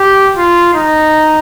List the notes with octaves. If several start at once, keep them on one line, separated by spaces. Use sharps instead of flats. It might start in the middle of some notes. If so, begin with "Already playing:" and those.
Already playing: G4
F4
D#4